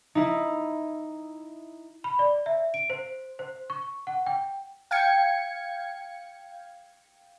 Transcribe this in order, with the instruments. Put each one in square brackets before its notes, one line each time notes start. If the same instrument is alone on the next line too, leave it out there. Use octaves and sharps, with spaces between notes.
[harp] D#4 E4
[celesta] B5
D5
E5
D7
C5
C5
C#6
F#5
G5
[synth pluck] F5 G5 G#6 C#7